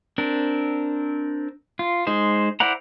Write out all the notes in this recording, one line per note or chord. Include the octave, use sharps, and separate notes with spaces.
C4 D4 A#4
F4
G#3 D#4 C5
E4 C5 D5 F#5 A#5